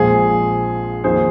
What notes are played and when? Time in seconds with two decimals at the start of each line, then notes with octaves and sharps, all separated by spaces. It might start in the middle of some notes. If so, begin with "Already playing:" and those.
Already playing: A#1 A#2 F3 G#3 C4 G#4
1.04 F2 D#3 A#3 G#4 C5